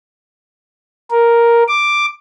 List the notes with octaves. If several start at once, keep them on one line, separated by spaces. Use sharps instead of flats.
A#4
D6